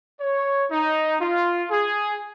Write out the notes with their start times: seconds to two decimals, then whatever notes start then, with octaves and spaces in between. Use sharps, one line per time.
0.21 C#5
0.71 D#4
1.21 F4
1.71 G#4